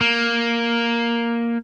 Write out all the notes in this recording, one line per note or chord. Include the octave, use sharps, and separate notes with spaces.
A#3